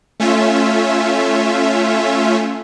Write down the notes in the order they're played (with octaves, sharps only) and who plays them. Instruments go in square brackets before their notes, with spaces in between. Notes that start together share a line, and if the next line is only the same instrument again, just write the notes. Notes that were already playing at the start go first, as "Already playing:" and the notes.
[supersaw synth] A3 C#4 F4 E5